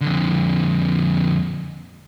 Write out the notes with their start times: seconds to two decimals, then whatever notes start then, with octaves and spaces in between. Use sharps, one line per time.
0.01 F2 D3